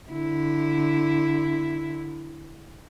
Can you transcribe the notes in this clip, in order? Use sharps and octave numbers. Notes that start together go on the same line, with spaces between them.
D3 E4